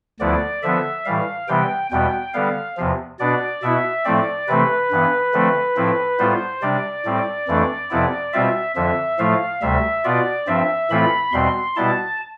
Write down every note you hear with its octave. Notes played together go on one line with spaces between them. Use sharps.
D2 D3 F3 B3 E4 D5
D3 F3 B3 E5
A2 E3 G3 F5
C3 E3 G3 B3 G5
E2 B2 G3 B3 G5
D3 G3 B3 F5
E2 C3 F3
B2 B3 D4 D5
B2 B3 E4 E5
A2 F3 A3 C4 D5
C3 E3 A3 C4 B4
G2 E3 B3
D3 F3 A3 C4
A2 F3 C4 E4
A2 G3 B3 F4 C5
C3 G3 D4 D5
A2 G3 C4
F2 E3 A3 D4
F2 C3 F3 B3 E4
B2 G3 C4 F4 E5
F2 D3 F3 E5
A2 F3 A3 F5
D2 C3 G3 E5
B2 B3 F4 D5
G2 F3 C4 E5
A2 E3 A3 C4 F4 B5
E2 B2 G3 C4 C6
B2 G3 B3 E4 A5